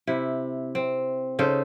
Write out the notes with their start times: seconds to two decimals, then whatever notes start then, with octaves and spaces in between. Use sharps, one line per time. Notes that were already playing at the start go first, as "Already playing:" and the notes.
0.07 C3 E4
0.75 C4
1.39 C#3 D#4 A4 C5